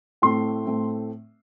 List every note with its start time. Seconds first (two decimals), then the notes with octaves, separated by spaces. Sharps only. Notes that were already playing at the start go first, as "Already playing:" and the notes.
0.22 A2 A3 C4 C6
0.66 A2 A3 C4